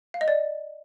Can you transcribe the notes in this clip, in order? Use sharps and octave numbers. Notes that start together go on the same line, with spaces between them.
F5
D#5
D5